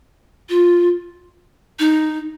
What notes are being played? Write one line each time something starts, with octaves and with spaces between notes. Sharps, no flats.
F4
D#4